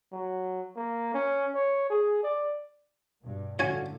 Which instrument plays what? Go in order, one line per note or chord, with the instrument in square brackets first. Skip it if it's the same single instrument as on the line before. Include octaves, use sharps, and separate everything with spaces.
[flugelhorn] F#3
A#3
C#4
C#5
G#4
D5
[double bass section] G2 B2
[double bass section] G1 A2 D3 [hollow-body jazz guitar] C#4 F4 F#4 [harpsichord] C#5 G#5